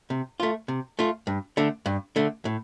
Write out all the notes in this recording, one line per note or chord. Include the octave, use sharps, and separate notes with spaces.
C3
A3 F4
C3
A3 F4
G2
D3 A3
G2
D3 A3
A2